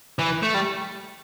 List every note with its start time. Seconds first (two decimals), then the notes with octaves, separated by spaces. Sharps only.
0.19 E3
0.43 A3
0.54 G3